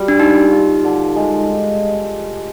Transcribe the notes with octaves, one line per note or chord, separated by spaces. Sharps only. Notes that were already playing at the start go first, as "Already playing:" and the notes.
Already playing: G3
D4
D#4 F4
F4
D3
G#3